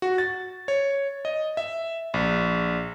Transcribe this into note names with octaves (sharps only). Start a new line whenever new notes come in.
F#4
A6
C#5
D#5
E5
A#1